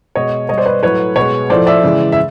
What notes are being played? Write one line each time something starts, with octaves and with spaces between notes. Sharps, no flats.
B2 G#3 C#5 D#5
B2 G3 C#5 D#5
C5 D5
B4 C#5
A2 F#3 A3 B4 C#5
B2 G#3 B4 C#5
A2 F3 A3 C5 D5
D5 E5
C#3 E3 G#3
E5